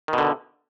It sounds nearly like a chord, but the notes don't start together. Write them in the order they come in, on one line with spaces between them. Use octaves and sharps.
D#3 B2 D3